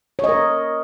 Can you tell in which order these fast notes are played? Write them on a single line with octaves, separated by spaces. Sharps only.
C#5 D#5 A#4